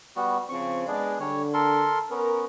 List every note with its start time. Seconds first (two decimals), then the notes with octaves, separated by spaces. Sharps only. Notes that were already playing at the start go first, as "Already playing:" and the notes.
0.16 G3 B3 F#4
0.49 C#3 F3 C4 C#6
0.88 G#3 B3 D4 G#4 D5
1.20 D3 G3 C#5
1.54 A4 A#4 C6
2.11 B3 C#4 A#4